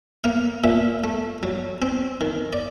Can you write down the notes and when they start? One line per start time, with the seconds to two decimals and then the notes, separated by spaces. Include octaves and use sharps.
0.24 A#3 F5
0.64 A#2 E5
1.04 A3
1.43 F#3
1.82 C4
2.21 D#3
2.53 D5